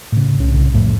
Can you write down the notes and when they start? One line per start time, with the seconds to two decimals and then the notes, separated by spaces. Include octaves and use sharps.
0.12 A2 C#3
0.39 C2 C#4
0.54 C2 C#3
0.75 G1 F2 A2